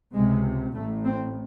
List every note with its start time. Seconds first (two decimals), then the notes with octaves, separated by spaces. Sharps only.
0.13 C#2 C3 G#3
0.74 A1 A2 A3
1.05 C4